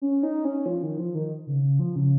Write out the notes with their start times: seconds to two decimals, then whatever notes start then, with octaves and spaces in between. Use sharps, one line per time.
0.02 C#4
0.23 D#4
0.45 C#4
0.66 F3
0.83 D#3
0.98 F3
1.15 D#3
1.47 C#3
1.63 C#3
1.79 F3
1.96 C#3